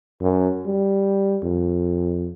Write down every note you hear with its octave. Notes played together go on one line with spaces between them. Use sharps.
F#2
G3
F2